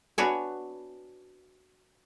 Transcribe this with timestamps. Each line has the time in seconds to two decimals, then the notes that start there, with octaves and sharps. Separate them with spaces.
0.18 B3 D4 F#4 C#5 G#5